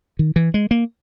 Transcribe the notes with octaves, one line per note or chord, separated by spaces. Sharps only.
D#3
E3
G#3
A#3